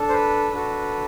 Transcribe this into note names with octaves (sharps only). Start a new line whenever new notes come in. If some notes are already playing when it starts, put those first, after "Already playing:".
Already playing: D4 A4
C5
B4
D4 F#4 A4